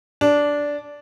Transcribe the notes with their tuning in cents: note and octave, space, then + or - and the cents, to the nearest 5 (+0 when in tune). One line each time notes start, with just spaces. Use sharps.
D4 -10